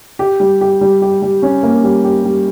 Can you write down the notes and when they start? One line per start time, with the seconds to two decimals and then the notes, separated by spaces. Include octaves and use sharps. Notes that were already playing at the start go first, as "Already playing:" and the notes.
0.19 G4
0.40 G3
0.61 G4
0.81 G3
1.02 G4
1.22 G3
1.42 C#4
1.63 A#3
1.84 G3
2.04 G4
2.25 G3